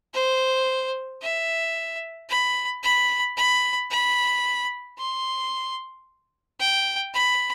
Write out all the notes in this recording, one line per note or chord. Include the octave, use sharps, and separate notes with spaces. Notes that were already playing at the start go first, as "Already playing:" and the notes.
C5
E5
B5
B5
B5
B5
C6
G5
B5